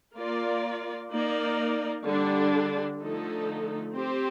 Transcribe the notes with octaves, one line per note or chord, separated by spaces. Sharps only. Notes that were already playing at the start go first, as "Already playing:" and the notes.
A#3 F4 A#4 D5
A#3 D#4 A#4 D5
D3 G3 D4
D3 F3 A3 D#4 A4
C4 G4 C5